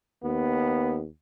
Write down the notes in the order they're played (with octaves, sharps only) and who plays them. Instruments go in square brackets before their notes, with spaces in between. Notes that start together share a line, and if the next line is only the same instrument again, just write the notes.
[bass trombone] D#2 [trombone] B3